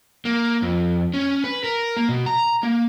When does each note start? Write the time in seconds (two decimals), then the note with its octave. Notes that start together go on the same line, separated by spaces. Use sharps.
0.25 A#3
0.62 F2
1.14 C#4
1.44 B4
1.64 A#4
1.97 A#3
2.09 B2
2.26 A#5
2.63 A#3